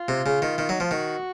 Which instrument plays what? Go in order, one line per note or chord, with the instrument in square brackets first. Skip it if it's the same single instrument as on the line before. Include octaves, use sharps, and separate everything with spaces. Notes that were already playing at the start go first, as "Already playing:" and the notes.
Already playing: [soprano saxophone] F4
[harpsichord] C3
C#3
D#3
D#3
[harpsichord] F#3 [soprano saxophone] D#4
[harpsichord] F3 [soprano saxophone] F4
[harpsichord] D#3 [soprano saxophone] F#4